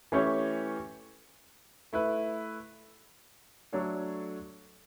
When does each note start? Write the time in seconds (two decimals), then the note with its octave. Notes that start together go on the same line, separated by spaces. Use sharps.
0.12 E3 A3 C#4 G4 C#5
1.93 A3 E4 B4
3.73 F#3 A3 D4 A4 C#5